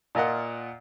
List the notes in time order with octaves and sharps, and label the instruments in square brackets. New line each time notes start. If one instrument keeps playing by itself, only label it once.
[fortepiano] A#2 F4 A#4 D#5 F#5